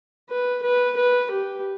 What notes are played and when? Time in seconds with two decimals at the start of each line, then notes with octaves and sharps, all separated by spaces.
0.29 B4
0.63 B4
0.96 B4
1.30 G4